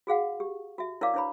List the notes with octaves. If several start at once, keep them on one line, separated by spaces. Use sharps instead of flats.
F#4 G#4 F5 F#5
G4
F#4 E5
E4 A#4 C#5 D5 F5 D6
D4 E4 B4 C#5 A#5 B5